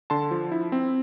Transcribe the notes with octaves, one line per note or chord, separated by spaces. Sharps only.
D3 A5 C6
F3
E4
C4